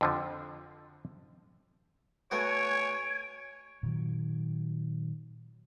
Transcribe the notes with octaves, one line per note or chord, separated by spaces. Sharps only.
F2 D3 F3
A3 B3 F#4 C#5 G#5 D7
A#2 D#3 F#3